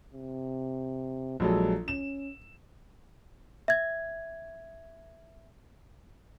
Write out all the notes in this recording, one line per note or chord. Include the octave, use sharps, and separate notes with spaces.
C3
A#1 F#3 G#3 A4
C#4 E7
E5 G#6